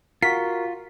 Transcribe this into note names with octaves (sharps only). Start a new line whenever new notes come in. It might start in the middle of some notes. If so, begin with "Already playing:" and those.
F4 F#4 A#4 B6